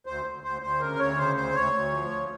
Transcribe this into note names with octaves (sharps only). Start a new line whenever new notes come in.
D2 C5
D2
D2 C5
D2 C5
C#3 A#4
D2 C#5
C#3 C5
D2 C5
D2 C#5
D2
F3
D2